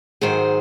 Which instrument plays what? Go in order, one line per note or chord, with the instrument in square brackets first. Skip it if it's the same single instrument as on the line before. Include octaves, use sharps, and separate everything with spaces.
[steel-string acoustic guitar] G#2 D#3 F#3 G#4 C5